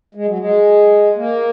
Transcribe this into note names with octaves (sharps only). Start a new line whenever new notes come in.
G#3
F#3
G#3
A#3